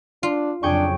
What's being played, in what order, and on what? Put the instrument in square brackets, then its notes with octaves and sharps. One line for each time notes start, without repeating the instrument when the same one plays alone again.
[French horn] D4 [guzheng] F4
[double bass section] F2 C#3 F#3 [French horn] D4 [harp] G#4 G5 C#6